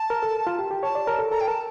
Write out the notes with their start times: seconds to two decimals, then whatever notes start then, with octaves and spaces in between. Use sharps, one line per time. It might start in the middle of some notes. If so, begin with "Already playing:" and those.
Already playing: A5
0.10 A#4
0.23 A4
0.47 F4
0.59 G4
0.71 G4
0.83 C#5 A5
0.95 D5
1.07 A#4
1.19 A4
1.31 A4 A#5
1.40 G5
1.47 A#4 A5